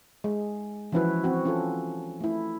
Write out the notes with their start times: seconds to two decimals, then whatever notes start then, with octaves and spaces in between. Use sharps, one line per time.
0.24 G#3
0.92 E3 F3 C#4 E4 F#4 B4
1.24 C4 F#4
1.45 C#4 F4 A4
2.21 A3 E4